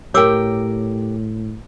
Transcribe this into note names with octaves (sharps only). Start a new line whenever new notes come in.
A2 G4 A#4 C#5 G5 D6 E6